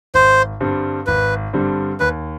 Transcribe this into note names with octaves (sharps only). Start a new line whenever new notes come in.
G#1 C5
G2 D3 G3 C4
G#1 B4
G2 D3 G3 C4
D#2 B4